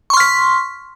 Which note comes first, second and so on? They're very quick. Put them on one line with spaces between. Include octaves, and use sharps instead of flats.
C#6 C6 F6 B6